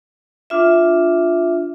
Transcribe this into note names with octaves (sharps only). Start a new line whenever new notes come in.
D4 F4 E5